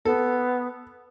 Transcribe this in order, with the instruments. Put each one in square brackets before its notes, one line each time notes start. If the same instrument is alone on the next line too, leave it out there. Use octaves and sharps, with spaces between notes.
[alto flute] B3 [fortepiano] A4